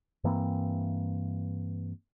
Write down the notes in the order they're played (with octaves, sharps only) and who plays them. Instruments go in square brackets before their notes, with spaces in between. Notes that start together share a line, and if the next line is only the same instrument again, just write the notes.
[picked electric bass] G2 E3 A#3 C4